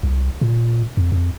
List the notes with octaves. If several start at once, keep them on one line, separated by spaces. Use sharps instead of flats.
C2
A#2
F2
F2